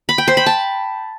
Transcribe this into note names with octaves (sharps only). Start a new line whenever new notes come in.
B5
G5
C5
B5
A5